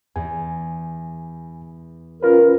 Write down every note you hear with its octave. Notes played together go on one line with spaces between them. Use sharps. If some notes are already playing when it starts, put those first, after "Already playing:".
E2 G#5
C#4 F4 A#4 B4